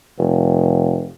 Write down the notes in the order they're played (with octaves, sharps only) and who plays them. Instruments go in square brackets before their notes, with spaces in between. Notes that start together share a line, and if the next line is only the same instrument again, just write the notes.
[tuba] F1